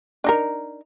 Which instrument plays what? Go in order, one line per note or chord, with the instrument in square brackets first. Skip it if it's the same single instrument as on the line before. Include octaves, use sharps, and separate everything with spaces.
[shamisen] D4 D#4 A#4